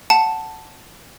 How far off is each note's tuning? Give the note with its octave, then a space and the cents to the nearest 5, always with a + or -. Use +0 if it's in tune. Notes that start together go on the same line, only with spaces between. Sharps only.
F#5 +5 A5 +0